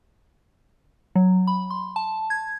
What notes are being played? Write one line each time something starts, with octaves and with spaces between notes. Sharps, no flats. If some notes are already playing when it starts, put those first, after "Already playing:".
F#3
B5
C6
A5
G#6